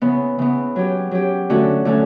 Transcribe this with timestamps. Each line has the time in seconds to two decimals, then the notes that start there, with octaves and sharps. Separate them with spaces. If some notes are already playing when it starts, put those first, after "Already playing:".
0.02 C#3 E3 B3
0.38 C#3 E3 B3
0.76 F#3 C#4 G4
1.11 F#3 C#4 G4
1.50 D3 A3 C#4 F#4
1.85 D3 A3 C#4 F#4